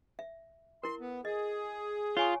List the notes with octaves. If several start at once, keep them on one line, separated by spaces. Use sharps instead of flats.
E5
E4 A#4 C6
B3
G#4 D#5
F4 C#5 G#5 C#6